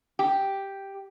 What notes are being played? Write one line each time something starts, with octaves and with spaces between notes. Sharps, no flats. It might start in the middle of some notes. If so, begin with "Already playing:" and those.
G4